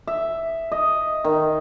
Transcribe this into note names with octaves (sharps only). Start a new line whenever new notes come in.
E5
D#5
D#3